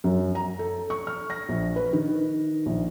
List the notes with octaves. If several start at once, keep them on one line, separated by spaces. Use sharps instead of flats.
F#2
A#5
A4
C#6
F6
A#6
A#1
B4
D#3
A#1